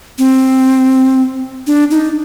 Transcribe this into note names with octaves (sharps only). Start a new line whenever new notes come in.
C4
D4
D#4